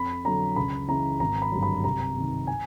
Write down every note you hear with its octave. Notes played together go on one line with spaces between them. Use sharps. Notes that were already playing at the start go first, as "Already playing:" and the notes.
Already playing: F2 B5
D3 F#3 A#5
C#2 B5
C#3 E3 A#5
G#1 A#5
B5
G2 D3 F#3
B5
C2 A#5
C3 D#3
G#5